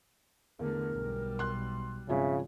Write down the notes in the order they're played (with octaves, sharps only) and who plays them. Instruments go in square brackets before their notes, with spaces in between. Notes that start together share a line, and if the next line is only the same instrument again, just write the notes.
[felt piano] E2 [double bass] D3 A3 [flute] A#4
[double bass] B1 G3
[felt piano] C6 F#6
[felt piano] G#1 F3 G#5 [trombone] C#3 [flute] E5